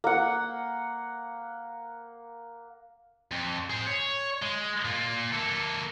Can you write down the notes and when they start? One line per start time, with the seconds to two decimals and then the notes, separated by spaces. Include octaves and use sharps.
0.04 A#3 F#5
3.31 F2
3.70 G#4 C5
3.87 C#5
4.42 G#3
4.85 A#3 F4
5.32 A#3 A4